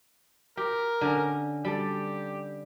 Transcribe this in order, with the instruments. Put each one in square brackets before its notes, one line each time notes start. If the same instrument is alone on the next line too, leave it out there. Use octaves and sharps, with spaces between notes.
[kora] G4 [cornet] A#4
[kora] D3 C#4
[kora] G3 A4 [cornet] G4